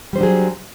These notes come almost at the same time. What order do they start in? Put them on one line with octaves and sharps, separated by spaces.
G3 C5 D4 F#3 G#4